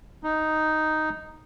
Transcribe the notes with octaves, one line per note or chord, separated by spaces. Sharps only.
D#4